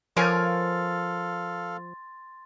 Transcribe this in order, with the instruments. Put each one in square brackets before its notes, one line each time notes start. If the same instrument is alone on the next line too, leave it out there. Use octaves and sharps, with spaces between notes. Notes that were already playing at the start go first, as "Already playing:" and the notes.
[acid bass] F3 [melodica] A4 F5 [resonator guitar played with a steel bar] A#4 C#5 G#5 [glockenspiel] C6 A6